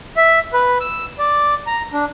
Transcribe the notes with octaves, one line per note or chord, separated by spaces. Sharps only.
E5
B4
E6
D5
A#5
D4